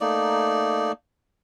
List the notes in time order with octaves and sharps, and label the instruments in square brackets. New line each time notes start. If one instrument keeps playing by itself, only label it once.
[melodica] A3 A#3 D#4 D5